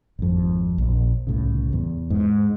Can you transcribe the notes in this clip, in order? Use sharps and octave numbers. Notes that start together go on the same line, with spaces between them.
G#1 F2
A#1
C2 A2 C#3
E2
G#2